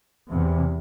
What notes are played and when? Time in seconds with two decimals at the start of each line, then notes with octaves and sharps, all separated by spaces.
0.30 E2 C3